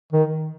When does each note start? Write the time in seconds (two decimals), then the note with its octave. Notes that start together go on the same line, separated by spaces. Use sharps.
0.13 D#3